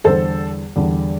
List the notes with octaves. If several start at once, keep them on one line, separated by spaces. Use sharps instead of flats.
E2 D3 G3 A4 C5
E2 D3 G3